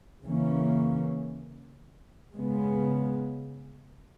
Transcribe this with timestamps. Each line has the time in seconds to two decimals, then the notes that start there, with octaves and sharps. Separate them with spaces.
0.24 C#3 E3 A#3 C#4
2.34 C#3 G#3 B3